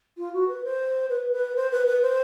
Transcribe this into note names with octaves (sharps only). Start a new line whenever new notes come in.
F4
F#4
B4
C5
B4
B4
C5
B4
B4
C5